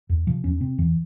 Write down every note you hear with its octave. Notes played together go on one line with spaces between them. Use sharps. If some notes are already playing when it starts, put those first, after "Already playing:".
E2
C3 F3
E2 C#4
C3 C4
E2 E3